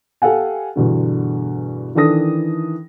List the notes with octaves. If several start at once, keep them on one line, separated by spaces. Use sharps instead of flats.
G4 A4 F5 F#5 G#5
E2 G2 B2 D3
D#3 E3 D4 A4 D#6 A#6